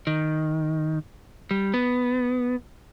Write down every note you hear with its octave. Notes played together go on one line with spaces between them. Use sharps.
D#3
G3
B3